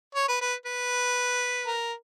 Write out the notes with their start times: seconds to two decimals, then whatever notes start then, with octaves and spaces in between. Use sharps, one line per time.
0.15 C#5
0.28 B4
0.41 B4
0.66 B4
1.66 A#4